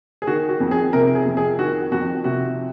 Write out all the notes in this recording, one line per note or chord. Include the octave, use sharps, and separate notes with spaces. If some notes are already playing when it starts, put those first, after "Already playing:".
G#4
D#3 F#4
F#4
F2
G#4
C3 A#4
G#4
F2
G#4
D#3 F#4
F2 F#4
C3 F#4